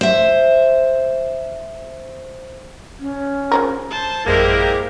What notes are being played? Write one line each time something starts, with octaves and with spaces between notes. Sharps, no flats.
C5 E5
C#4
C#3 F3 A#4
C5 A5
A1 F#2 G#3 A#3 E4 G4 A#4 C5